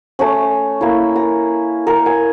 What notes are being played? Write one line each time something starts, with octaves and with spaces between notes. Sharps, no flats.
A3 C#4
A#3 E4
A#5
A#4
G#5